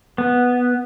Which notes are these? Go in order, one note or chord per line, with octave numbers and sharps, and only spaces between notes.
B3